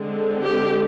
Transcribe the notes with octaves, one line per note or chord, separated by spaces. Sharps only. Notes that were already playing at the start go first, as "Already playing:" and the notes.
Already playing: D3 G#3 C4
G4